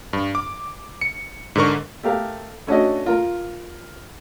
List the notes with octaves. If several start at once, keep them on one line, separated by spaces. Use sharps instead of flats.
G2
D6
C#7
G#2 D3 A#4 C#6
A3 G4 A#4 F5
A3 C#4 D4 F#4 D#5
F4 A#4